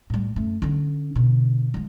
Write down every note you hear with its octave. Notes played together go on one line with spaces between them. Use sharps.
A2 G3
F#2 A3
D3 C#4
B2 D3
F3 G#3